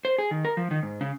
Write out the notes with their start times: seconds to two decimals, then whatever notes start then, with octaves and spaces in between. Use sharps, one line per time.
0.05 C5
0.18 G#4
0.31 D#3
0.45 A#4
0.57 F3
0.71 D#3
0.83 G#2
1.01 C#3